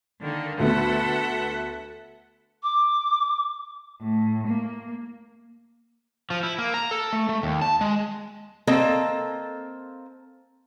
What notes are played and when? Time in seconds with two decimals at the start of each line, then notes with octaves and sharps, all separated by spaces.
0.21 D3 D#3 A#3
0.60 D2 A3 B3 A4 E5 F#5
2.63 D6
4.02 A2
4.48 A#3
6.30 F3
6.43 E4
6.58 A#3
6.74 A#5
6.91 A4
7.13 A3
7.29 A3
7.43 D#2
7.62 A5
7.81 G#3
8.67 A#3 C4 A4 D#5